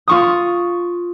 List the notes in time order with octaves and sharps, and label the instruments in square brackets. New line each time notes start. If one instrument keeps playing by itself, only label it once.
[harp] F4 C#6 D#6